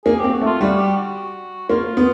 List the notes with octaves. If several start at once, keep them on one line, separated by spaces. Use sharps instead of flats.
A#3 G#4
G4
C4
F#4
A3
F4
G3 F#4
G4
F#4
A#3 F4
B3